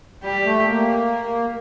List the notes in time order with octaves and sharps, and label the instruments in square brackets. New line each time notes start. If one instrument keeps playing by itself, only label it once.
[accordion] G3 [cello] G4
[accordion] A3
A#3